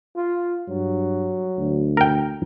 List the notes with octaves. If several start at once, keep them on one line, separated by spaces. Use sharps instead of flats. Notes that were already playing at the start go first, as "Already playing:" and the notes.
F4
G2 F#3
D2
A#4 G5